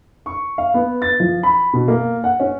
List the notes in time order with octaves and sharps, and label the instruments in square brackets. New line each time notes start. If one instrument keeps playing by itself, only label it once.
[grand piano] C#6
F5
B3
A6
F3
B5
B2
A#3
F#5
C#4